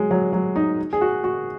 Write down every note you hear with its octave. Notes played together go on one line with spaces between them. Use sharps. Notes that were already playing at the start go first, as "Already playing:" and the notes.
Already playing: F#3 G#3
F#3
F#3
D#4
G#4
F#4
F#4